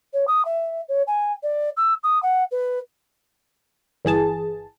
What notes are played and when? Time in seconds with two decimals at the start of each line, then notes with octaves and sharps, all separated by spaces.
0.13 C#5
0.27 D#6
0.45 E5
0.88 C#5
1.07 G#5
1.42 D5
1.76 E6
2.03 D#6
2.22 F#5
2.51 B4
4.05 G1 E3 G#4 A5